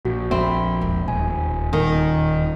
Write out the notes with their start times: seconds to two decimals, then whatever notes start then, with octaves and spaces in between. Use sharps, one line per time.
0.05 A#1 F#4
0.31 F2 C4 E5 B5
0.81 E1
1.08 D#1 G#5
1.73 D#1 D#3